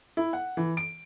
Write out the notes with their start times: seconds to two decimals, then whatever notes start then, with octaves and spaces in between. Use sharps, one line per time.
0.17 E4
0.33 F#5
0.57 E3
0.77 D7